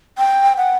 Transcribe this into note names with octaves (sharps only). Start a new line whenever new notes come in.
G5
F#5